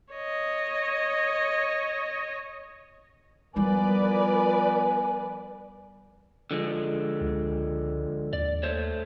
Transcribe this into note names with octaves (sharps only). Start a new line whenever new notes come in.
C#5 D#5
F3 G3 B3 E4 A#4 B4 D5 G#5
D3 F3 G#3
C#2
D#2 D5
A3 C5 C#5